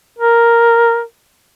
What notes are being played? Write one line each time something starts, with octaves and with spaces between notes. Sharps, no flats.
A#4